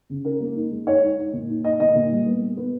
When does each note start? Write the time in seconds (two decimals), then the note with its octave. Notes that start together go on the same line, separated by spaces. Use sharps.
0.10 C#3
0.25 C#4 A#4
0.40 A#3
0.56 D#4
0.71 G#3
0.87 D#4 C#5
1.03 D#4
1.18 D#4
1.33 A#2
1.49 D#4
1.64 D#4 D#5
1.80 A#2 D#5
1.95 A#2
2.11 G3
2.26 B3
2.42 B3
2.57 B3